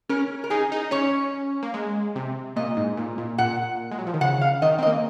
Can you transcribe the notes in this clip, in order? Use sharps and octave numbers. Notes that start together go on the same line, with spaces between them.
C#4 A#4
A#4
D#4 G#4
D#4
C#4 C#5
A#3
G#3
C3
A#2 D#5
G#2
A#2
A#2
A#2 F#5
G#3
F#3
F3
D#3
C#3 F#5
F5
D#3 D#5
C4
D#5
A#3